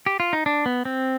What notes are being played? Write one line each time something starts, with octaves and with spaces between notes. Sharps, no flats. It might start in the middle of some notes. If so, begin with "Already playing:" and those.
G4
F4
D#4
D4
B3
C4